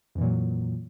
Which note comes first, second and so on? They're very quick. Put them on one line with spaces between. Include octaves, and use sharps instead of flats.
F2 E3 A#2 F#3